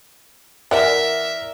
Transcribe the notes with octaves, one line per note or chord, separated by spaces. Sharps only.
E3 A#4 D5 E5 F#5